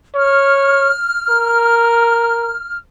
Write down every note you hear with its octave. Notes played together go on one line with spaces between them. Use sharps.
C#5 F6
A#4